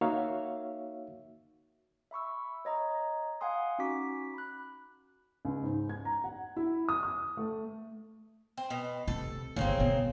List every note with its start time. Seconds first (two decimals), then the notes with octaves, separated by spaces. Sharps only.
0.01 A#3 D#4 F#4 C#5 E5 F5
2.11 E5 B5 C#6 E6
2.65 C#5 D#5 A#5
3.41 F5 F#5 G#5 C6 D#6
3.79 C#4 D#4 F#4 D6 B6
4.34 B5 F#6
5.45 C#2
5.63 G#2
5.89 G#6
6.05 A#5
6.24 F#5
6.57 E4
6.89 D#6
7.03 D#6
7.37 A3
8.58 C4
8.70 B2
9.08 C3 A4
9.56 G1 C2 C#3 A#3 C4
9.78 B2 B3